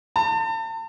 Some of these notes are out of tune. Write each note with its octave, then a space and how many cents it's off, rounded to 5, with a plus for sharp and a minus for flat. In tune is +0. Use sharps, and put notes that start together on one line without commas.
A5 +35